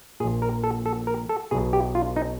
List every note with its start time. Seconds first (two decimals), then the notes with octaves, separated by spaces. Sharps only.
0.20 A#2 G#4
0.24 A#1
0.42 A#4
0.64 A4
0.86 A4
1.07 A#4
1.29 A4
1.51 B1 B2 G#4
1.73 G4
1.95 F4
2.16 D#4